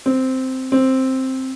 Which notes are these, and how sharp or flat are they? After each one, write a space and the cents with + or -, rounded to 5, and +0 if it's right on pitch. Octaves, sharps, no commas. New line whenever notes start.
C4 -5
C4 +5